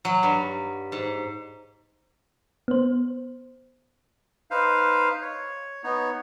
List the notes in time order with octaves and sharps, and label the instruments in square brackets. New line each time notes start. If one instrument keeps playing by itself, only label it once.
[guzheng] F#3
G2
G#2
[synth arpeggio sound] B3 C5
[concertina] D#4 B4 C5 F5
C#5
B3 D#4 C#5